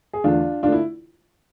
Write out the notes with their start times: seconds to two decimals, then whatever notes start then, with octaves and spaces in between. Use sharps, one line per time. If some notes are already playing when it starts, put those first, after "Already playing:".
0.13 G#4
0.24 E2 D3 A3 D4 F4
0.63 D3 A3 D4 F4
0.72 E4